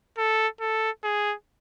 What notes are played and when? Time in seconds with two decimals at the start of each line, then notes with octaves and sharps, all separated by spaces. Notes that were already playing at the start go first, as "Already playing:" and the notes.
0.18 A4
0.60 A4
1.04 G#4